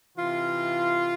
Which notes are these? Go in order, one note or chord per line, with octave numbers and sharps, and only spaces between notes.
C3 E3 F4